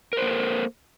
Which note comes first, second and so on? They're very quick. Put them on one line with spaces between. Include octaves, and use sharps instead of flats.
A#4 C5 A#3 A4